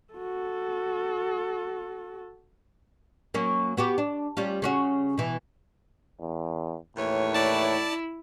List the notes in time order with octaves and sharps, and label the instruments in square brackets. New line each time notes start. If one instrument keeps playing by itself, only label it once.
[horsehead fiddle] F#4 A4
[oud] F#3 A#3 C#4
B3 F#4 G4
D4
G3 C#4 F4
C#3 C#4 F#4
B2 E3
[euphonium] E2
[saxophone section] D#2 E3 C#5 [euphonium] A2
[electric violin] E4 [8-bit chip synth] D5 A5